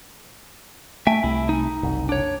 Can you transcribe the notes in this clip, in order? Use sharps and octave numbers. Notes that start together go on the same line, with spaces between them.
A3 E5 G5 G#5
C2 C3 A3 E4
D#4
F#1 C2
D4 C#5